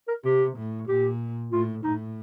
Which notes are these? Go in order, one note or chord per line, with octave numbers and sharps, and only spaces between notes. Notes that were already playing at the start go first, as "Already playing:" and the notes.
A#4
C3 G4
A2
A#2 G4
A2 F4
A2 D#4